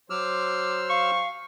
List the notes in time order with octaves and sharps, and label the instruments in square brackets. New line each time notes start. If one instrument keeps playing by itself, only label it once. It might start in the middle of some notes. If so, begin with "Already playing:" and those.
[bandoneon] F#3 E6 F6 [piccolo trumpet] C5 [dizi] D6
[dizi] F5 [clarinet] C#6